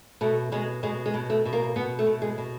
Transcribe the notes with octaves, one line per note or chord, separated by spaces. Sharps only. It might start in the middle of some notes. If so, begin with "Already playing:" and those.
B2 A3
B2 G#3
B2 G#3
G#3
B2
A3
B2
A#3
B2 B3
A3
B2
G#3
B2